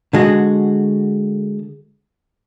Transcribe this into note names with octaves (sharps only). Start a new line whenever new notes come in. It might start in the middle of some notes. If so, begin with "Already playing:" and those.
D3 G#3 F#4